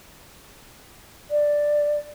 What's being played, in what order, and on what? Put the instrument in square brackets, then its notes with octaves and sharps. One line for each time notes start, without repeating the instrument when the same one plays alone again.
[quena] D5